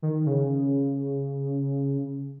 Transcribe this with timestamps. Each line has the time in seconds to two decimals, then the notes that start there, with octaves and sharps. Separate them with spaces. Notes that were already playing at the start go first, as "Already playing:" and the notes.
0.02 D#3
0.26 C#3